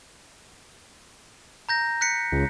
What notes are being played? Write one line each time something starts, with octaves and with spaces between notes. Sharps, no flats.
A#5 G6 A#6
F#6 B6 C#7
C#2